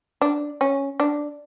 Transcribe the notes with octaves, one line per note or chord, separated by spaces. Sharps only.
D4
C#4
D4